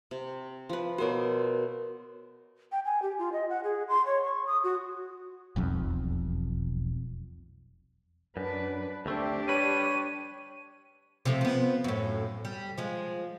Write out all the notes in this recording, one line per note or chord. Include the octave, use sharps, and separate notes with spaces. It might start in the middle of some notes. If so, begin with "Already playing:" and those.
C3
F3 B4
B2 F#4 A#4 C5 C#5
G5
G#5
G4
F4
D#5
F#5
G#4
C6
C#5
C#6
D#6
F#4
E1 B1 F2
F#2 D4 B4
D2 A3 C4 D4 G4
G3 B4 C#5 D#7
C3 F3 A3
F3 B3
F#2 A2
G3
F3 G#3